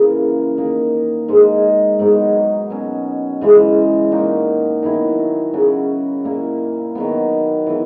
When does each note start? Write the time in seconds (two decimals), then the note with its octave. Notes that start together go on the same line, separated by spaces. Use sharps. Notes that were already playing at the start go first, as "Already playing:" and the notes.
Already playing: C#3 E3 A#3
0.57 D#3 A#3 D#4
1.28 G#2 D#3 G#3 D#4
1.99 G#2 F#3 B3 D#4
2.70 B2 F#3 C#4
3.41 C#3 E3 G#3
4.12 A#2 A#3 D#4 F#4
4.83 D#3 F#3 B3 E4
5.53 C#3 F#3 C#4 F#4
6.24 A#2 A#3 E4
6.95 D#3 F#3 B3
7.66 E3 B3 E4